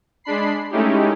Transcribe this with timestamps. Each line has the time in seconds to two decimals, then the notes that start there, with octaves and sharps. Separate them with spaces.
0.24 G#3 D4 B5 C7
0.71 G#3 A3 C#4 D#4 E4 G4